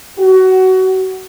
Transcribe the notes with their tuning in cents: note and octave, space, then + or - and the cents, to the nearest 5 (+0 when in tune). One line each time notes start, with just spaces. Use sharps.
F#4 +20